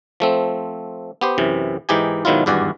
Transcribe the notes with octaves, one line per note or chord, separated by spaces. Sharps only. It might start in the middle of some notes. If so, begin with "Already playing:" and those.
F3 A3 C4
B3 G4 C5
F#2 C3 E3
G#2 E3 D#4 G4 G#5
G#2 B2 D#3 F#3 E4 F4
G#1 E2 G2 F#4 D5 G#5